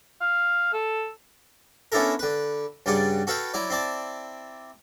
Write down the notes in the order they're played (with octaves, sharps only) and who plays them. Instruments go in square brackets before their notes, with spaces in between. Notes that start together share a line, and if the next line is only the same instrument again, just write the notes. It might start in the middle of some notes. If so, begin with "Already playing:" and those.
[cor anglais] F5
A4
[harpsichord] B3 C#4 D4 E4 A4 A#4
D3 B4
G2 C#3 G3 D5 F#5
F#4 A4 B4 F5 G5
F#3 E4 D5
C4 E4 D5 A5